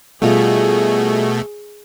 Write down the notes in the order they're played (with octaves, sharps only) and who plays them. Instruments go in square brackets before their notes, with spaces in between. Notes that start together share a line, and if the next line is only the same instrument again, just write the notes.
[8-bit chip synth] B2 A3 [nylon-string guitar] G3 F4 [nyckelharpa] G#4